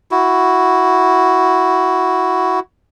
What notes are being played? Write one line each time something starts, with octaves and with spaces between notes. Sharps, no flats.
E4 F#4